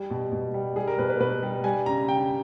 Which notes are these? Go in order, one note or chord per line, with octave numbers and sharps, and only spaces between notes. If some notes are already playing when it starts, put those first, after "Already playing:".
Already playing: G3 G4
B2
B2
G3
G3 G#4
A#4
B2 B4
B4
B2 B4
G3
G3 G#5
C#3 A#5
C#3 G5